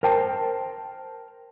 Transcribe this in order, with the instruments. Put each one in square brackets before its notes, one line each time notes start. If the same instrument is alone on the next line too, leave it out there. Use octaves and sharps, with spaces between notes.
[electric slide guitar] A#4 C5 G5 A5